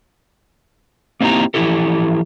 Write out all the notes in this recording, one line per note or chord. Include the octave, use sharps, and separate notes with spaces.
A#3 C4 D#4 E4 G4 A#5
E3 F3 E4 G4 A4